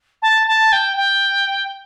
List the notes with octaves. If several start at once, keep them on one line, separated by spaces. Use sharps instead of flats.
A5
A5
G5
G5